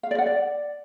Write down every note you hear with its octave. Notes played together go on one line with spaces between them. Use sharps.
F5
D5
F#5
D5